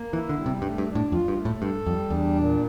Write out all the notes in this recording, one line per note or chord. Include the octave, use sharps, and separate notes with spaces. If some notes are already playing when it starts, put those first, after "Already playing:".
Already playing: A#3
E3 E4
D3
G3
C3
G2 A3
G2
D4
A2
F2 F4
G2
A3
A2
G2 A4
F2 G3
E2 D4
A#2